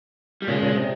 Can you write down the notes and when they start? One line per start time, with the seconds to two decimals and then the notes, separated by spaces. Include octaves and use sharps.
0.42 G3
0.48 A#2 C#3 G#3
0.62 A#2 C#3
0.76 C3